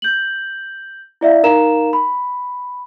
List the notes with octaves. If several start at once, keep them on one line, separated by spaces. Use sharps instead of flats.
G6 F#7
E4 D5 E5 F5
D#4 A#4 F5 A#5 E7
B5